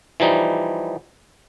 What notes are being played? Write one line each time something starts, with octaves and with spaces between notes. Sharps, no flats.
E3 F3 G3 D#4